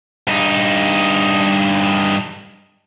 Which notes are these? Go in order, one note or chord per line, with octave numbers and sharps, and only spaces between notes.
G2 D#4